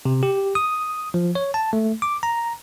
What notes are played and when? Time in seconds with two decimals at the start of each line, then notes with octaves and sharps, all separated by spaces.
0.05 C3
0.23 G4
0.55 D#6
1.14 F3
1.35 C#5
1.54 A5
1.73 A3
2.02 D6
2.23 A#5